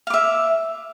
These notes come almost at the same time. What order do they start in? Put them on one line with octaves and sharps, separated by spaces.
F5 D6 E5